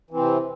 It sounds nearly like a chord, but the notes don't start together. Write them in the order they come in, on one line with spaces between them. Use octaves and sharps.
E3 C4 C3